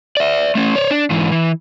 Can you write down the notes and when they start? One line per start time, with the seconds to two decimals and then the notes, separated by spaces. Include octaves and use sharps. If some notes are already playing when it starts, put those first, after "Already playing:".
0.17 D5 E5
0.55 A3 C#4
0.76 C#5 D5
0.91 D4
1.10 G#2 E3
1.32 E3